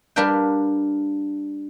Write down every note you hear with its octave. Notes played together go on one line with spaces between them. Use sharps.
G3 D4 A#4 B4 F5 G5